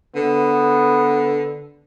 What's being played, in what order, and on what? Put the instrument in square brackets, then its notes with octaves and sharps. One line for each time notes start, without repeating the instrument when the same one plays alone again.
[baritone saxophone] D3 [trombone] B3